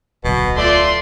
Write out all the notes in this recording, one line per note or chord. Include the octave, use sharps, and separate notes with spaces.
D1 B1 B2
A3 F4 D5 C6